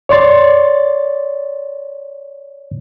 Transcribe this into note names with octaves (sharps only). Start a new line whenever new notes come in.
C#5 D5 C6 A6